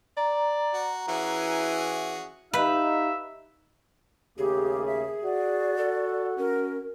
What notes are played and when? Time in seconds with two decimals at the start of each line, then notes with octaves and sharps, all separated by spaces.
0.17 D5 A#5
0.73 F#4
1.08 E3 C#4 F#4 G#4
2.53 D#4 G4 B4 E5 F5
4.38 D#2 C#3 A3 G4 G#4
4.86 E5
5.24 F#4 D5
5.77 A4
6.38 C#4 A#4